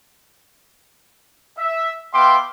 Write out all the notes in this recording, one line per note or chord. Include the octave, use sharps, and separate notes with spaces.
E5
B3 E5 F5 G5 C6 D6